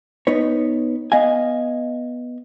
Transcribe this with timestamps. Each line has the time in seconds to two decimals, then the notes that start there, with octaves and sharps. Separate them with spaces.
0.27 B3 D#4 B4 C#5
1.12 B3 D#5 F5 G#5